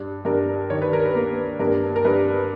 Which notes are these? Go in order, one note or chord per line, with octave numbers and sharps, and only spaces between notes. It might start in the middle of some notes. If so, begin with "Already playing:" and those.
Already playing: G2
G2 A#4
D#3 C#5
B4
A#4
B4
A#3
G2 A#4
A#4
G2 B4